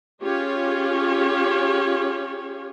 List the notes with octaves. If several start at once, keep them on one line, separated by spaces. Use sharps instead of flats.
C#4 F4 G4 G#4 C#5